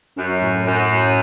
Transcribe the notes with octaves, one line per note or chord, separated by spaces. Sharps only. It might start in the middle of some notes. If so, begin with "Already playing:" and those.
F#2 C#4
A2
F#2 A2
A2